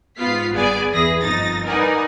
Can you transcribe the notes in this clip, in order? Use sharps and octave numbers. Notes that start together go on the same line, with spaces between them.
G#2 B3 F4 F5 B6 C7
G1 B3 G#4 D5 G#5
E2 E4 G#4 B4 A#6
G1 F2 D#4 A6 A#6
D#4 A#4 B4 D5 F#5 G#5